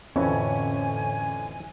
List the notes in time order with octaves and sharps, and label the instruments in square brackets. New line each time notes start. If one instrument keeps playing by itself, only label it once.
[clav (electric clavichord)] F2 E3 [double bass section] A2 D3 [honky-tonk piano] C#4 [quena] G#5